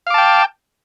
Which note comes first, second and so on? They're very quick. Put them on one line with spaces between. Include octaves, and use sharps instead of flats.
F5 D6 A5 G5